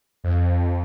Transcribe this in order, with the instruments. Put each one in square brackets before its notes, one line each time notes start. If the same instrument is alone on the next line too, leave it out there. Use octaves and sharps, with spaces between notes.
[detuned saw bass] F2